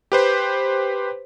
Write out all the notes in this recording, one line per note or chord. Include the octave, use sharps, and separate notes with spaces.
G4 B4 C5